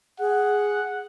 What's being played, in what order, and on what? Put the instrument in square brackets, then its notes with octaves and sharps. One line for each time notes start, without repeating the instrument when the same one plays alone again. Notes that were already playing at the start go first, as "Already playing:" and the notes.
[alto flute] G#4 [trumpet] F#5